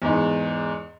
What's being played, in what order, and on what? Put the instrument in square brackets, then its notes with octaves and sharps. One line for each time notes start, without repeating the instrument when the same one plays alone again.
[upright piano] E2 G#2